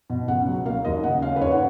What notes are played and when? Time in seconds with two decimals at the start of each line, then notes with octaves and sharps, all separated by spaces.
0.10 B2
0.28 C#2 F#5
0.47 F#3
0.65 A#3 F5
0.85 D#2 D#5
1.03 C#3 F#5
1.22 C#4 F5
1.36 B4
1.41 D#2 C#5
1.51 F#5